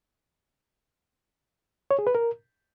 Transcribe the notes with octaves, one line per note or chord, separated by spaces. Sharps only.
C#5
G#4
B4
A#4